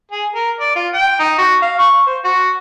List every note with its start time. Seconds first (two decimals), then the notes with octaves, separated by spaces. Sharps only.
0.12 G#4
0.35 A#4
0.60 D5
0.76 F4
0.94 G5
1.20 D#4
1.38 F#4
1.62 F5
1.79 C#6
2.06 C5
2.24 F#4